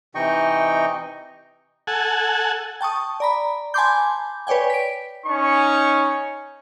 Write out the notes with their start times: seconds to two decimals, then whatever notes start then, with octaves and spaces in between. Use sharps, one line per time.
0.15 C3 E3 D#4 D#5 G5 C#6
1.87 A4 F#5 G#5
2.81 G5 A5 C#6 D#6
3.20 D5 A#5 B5
3.74 G#5 A5 B5 C6 D6 G6
4.47 B4 C#5 D5 G5 G#5
4.70 B6 D7
5.27 C#4 D#4 C#6